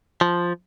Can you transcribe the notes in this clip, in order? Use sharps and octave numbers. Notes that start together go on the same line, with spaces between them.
F3